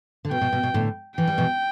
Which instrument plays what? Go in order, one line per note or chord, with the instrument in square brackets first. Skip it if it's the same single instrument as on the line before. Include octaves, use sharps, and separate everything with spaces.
[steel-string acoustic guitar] D3
[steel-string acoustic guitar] B2 [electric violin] G5
[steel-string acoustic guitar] B2
B2
B2
A2 D3
[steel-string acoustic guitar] E3 [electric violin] G5
[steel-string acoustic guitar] G3
B2 E3